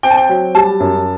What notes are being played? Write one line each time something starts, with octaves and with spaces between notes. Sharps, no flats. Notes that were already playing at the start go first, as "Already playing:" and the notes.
C4 G5
A5
G5
F#3
G3 A5
F#2